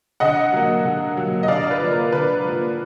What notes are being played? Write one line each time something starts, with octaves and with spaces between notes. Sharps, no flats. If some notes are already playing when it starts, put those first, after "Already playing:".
D3 D#5 F#5
F#3 A#3
D3
F#3 A#3
D#5
D3 D5 F5
B4
F3 A#3
A#4
D3 B4
F3 A#3